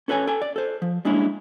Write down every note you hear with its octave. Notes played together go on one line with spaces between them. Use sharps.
C#4 A4 B4 C#5 G#5
A4 G5 G#5
D5
A4 C5
F3
G3 G#3 A#3 C#4 D4 E4